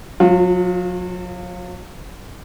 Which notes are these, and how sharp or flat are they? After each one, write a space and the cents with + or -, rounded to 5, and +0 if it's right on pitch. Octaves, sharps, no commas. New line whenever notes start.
F#3 -40 F4 +10